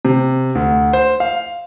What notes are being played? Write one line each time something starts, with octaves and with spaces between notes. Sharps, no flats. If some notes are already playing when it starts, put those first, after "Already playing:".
C3
D2
C5
F5